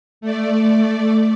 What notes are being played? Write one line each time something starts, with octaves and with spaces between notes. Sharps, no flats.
A3 D5